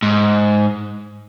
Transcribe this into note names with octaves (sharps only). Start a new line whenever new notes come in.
G#2